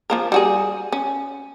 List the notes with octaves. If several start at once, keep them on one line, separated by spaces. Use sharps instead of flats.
F3 A#3 A#4
G3 F#4 G#4
C#4